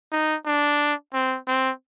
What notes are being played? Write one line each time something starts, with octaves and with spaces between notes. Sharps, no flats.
D#4
D4
C4
C4